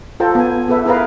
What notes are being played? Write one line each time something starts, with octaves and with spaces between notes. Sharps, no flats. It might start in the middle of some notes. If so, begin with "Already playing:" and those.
F4 A4 C5 G5 A5 A#5
B3 G#5
B3 G#4 A4 B4 E5
E4 G#4 A#4 B4 F5